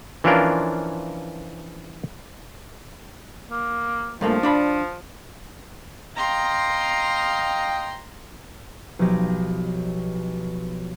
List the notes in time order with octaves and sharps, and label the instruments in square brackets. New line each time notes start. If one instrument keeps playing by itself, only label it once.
[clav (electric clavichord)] E3 F3 C#4 D4 F4 A#4
[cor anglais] A#3
[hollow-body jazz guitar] G2 A3 A#3 [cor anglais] F3
[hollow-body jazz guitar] D4 D5 B5
[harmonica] D#5 F5 G5 [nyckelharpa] A#5 C6
[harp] B1 F3 G4 C#5 D#5 A#6